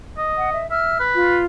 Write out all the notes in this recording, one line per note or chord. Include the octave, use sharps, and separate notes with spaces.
D#5
F#5
E5
E5 F6
B4
F4